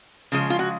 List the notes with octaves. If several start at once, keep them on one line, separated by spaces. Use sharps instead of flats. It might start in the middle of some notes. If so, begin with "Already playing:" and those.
C#3 F3 G#3
F4
F#4